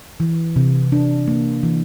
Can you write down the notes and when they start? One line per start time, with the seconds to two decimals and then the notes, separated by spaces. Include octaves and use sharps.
0.20 E3
0.56 C3
0.92 D4
1.28 A#3
1.63 E3